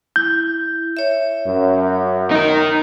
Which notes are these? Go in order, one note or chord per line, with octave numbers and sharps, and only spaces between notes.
E4 G6
C#5 E5
F#2
D#4 A#4